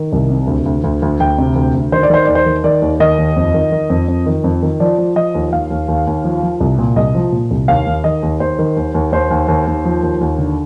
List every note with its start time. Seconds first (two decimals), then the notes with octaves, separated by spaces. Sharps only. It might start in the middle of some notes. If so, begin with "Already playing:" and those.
Already playing: D#3
0.12 C2
0.30 C3
0.47 D2
0.66 D2
0.84 D2
1.02 D2
1.20 D2 G5
1.38 C3
1.56 D2
1.74 D2
1.92 D#3 C5
2.03 D5
2.10 D#3 C5
2.25 D#2 D5
2.35 C5
2.46 D#3
2.64 D#3 D5
2.82 D#2
3.00 D#3 D#5
3.18 D#2
3.36 F2
3.54 D#3
3.72 D#3
3.90 F2
4.08 F2
4.26 D#3
4.44 F2
4.62 D#3
4.80 F3 D5
4.98 F3
5.16 F3 D#5
5.35 D#2
5.52 D#2 F5
5.70 D#2
5.88 D#2
6.07 D#2
6.24 F3
6.43 F3
6.60 C2
6.79 A#2
6.96 C2 D#5
7.15 F3
7.32 A#2
7.51 C2
7.68 D#2 F5
7.87 D#2
8.04 D#3 D#5
8.23 D#2
8.40 D#2 C5
8.59 D#3
8.77 D#2
8.94 D#2
9.12 D#2 C5
9.31 D#2
9.48 D#2
9.67 D#2
9.85 F3
10.03 D#2
10.21 D#2
10.38 D3